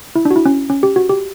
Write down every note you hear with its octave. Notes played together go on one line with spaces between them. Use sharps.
E4
D4
F#4
E4
C#4
C#4
G4
F#4
G4